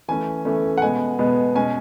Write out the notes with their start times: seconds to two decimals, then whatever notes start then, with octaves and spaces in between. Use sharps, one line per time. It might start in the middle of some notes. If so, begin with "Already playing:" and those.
0.08 E3 A3 C#4 G#5
0.45 E3 A3 C#4
0.78 F#5
0.82 B2 G#3 B3 G#5
1.19 B2 G#3 B3
1.55 B2 G#3 C#4 G#5